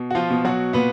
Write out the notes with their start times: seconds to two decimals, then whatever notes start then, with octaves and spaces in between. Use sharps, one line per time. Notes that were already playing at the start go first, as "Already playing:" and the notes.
Already playing: B2
0.11 F#4
0.15 F3 F4
0.30 B2
0.45 F#3 F#4
0.73 A#2 B3 B4